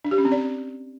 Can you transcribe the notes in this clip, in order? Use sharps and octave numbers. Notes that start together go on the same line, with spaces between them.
D4
G4
C#4
C4
D5